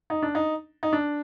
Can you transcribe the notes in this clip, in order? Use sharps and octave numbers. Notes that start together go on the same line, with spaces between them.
D#4
D4
D#4
D#4
D4